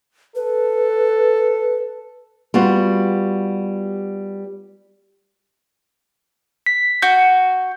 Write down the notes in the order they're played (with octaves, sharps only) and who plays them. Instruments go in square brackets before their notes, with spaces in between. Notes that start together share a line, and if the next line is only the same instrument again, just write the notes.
[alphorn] A4 [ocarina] B4
[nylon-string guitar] G3 B3 F4 F#4
[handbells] B6
[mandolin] F#4 [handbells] G6